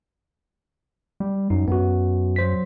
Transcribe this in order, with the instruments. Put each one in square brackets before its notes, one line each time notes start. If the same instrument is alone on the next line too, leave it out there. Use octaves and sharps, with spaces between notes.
[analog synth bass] G3
[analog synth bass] F#2 [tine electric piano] D#4
[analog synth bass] F#2 [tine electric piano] B3 F#4
[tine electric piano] F#3 C5 B6